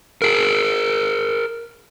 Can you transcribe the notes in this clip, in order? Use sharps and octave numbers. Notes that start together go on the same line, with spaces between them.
G#4 A#4